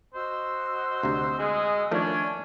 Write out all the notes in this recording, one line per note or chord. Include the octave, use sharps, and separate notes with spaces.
F#4 C5 D#5 E6
D2 C3
G#3 G#4
D#3 F3 A3 C#4 D4 C#6 G#6